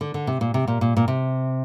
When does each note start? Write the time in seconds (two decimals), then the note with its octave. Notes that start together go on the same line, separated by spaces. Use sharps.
0.01 D3
0.14 D3
0.27 C3
0.41 A#2
0.54 C3
0.68 A#2
0.81 A#2
0.97 A#2
1.08 C3